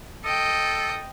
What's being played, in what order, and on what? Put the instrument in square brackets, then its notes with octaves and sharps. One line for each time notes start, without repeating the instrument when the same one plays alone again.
[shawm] A4 [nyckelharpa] D#5 G5